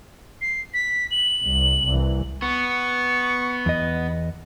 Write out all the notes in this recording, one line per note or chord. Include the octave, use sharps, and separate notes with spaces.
C7
B6
F#7
C2
C2 E3
B3 C#6
E2 D#5